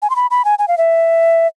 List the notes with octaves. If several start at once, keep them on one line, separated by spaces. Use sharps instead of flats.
G#5
C6
B5
B5
G#5
G#5
F5
E5